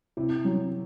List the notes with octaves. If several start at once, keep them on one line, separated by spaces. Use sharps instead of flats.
C3 E4
F#3